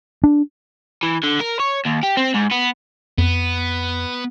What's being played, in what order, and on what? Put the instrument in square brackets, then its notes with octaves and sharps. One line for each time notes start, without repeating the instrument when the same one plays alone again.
[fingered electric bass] D4
[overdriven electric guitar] E3
D3
A#4
C#5
D#2
G4
C4
G#2
B3
[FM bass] F2 [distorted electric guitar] B3